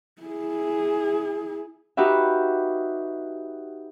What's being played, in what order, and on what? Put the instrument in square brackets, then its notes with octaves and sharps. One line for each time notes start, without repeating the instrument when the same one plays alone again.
[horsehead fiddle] E4 G#4
[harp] D#4 F#4 G4 B4 E5